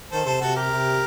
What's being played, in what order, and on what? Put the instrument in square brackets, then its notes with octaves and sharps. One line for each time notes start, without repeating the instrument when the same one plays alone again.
[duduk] D#3 [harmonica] A4 C5
[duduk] C3 [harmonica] A4 C5
[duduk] C3 [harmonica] F#4 A4
[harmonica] G4 A#4
[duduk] C3